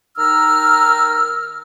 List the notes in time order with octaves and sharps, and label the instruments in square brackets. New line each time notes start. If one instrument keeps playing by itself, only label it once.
[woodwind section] D#3 D#4 A#5 E6 F6